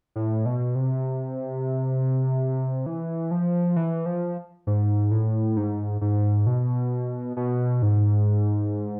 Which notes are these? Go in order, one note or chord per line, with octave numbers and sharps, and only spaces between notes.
A2
B2
C3
E3
F3
E3
F3
G#2
A2
G#2
G#2
B2
B2
G#2